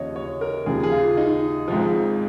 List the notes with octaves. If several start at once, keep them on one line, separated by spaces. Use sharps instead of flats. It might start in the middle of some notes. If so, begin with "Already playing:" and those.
Already playing: D#2 C#3 F3 C#5 D#5
C#5
A#4
D#2 C#3 F3 G#4
G#4
F4
D#4
G#1 G#2 F3